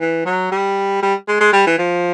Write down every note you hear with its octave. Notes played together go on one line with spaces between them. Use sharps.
E3
F#3
G3
G3
G#3
G#3
G3
E3
F3